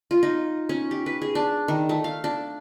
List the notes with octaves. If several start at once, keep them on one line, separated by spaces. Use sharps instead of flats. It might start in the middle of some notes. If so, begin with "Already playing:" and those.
F4
D#4
C#4
G4
B4
G#4
D4
D#3
A3
F5
D4